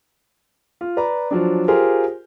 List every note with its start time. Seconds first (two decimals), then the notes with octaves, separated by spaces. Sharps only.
0.81 F4
0.97 B4 D5 A#5
1.31 F3 F#3 D4
1.68 F4 G4 G#4 A#4 C5